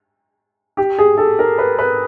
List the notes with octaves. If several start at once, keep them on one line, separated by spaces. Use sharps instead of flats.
G4
G#4
A4
A#4
B4
B4